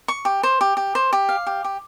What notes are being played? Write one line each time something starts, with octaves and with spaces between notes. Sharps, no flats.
C#6
G4
C5
G4
G4
C5
G4
F5
G4
G4